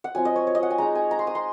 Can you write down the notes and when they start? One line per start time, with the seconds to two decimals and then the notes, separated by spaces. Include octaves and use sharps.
0.04 F#5
0.15 F#3 C4 F4 G#5
0.25 D#5
0.36 C#5
0.47 C#5
0.55 D#5
0.63 F#5
0.70 G#5
0.78 G#3 D#4 A#5
0.95 G#5
1.11 A#5
1.19 C6
1.27 D#6
1.35 C6